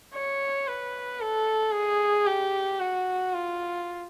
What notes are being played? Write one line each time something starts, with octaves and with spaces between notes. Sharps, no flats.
C#5
B4
A4
G#4
G4
F#4
F4